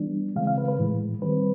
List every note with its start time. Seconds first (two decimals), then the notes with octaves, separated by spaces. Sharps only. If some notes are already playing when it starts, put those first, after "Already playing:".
Already playing: E3 G3 B3 D4
0.36 C#3 E3 G#3 C4 F5
0.47 F5
0.58 B4
0.68 B4
0.79 A2 E3 G#3
1.21 D#3 G3 C4 B4